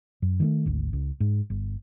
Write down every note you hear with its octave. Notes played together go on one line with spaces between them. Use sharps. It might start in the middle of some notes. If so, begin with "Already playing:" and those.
F#2
D#3 G3 A3
G#1 D2
C#2
G#2
G1